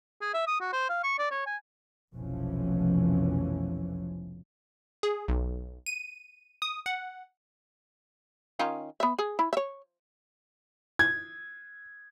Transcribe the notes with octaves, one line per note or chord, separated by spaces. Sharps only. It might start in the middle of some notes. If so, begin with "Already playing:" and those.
G#4
E5
D#6
F#4
C5
F5
C#6
D5
C#5
G#5
F1 B1 B2 E3 F3 C#4
G#4
B1
D#7
D#6
F#5
D#3 C#4 F4
B3 E5
G#4
E4
C#5 E5
G#6